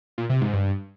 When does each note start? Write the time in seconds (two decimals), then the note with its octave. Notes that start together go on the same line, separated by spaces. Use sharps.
0.18 A#2
0.30 C3
0.41 G#2
0.53 G2